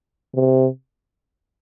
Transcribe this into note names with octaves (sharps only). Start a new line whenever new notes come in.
C3